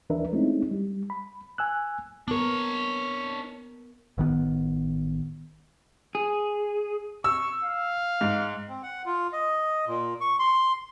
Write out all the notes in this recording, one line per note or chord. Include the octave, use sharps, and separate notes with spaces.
D#2 E3 D4 A#4 B4 E5
G#3 A3 C4 C#4 D#4 E4
G3
B5
G#5 E6 F#6
B3 D4 A#4 C#5
A1 D#3 G3 B3
G#4
C#6 E6
F5
G#2
C4
F#5
F4
D#5
A#2
C#6
C6